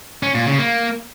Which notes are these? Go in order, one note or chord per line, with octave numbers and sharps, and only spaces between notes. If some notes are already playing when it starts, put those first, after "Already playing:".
C#4
A#2
C#3
A#3